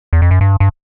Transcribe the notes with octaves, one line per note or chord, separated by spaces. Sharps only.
E2
F2
F#2
G2
G2